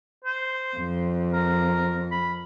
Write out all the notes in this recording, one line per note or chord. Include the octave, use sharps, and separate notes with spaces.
C5
F2
A#4
B5